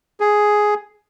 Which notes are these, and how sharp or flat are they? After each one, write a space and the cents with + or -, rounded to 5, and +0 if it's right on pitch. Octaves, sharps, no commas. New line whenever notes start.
G#4 +5